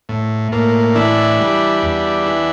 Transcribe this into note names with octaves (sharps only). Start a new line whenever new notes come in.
A2
A2 A#3
E3 D4 E4
G3
E2
E3